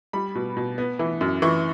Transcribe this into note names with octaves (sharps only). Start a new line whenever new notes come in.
G3 B5
B2
B2
B3
E3
F#2
E3 C#6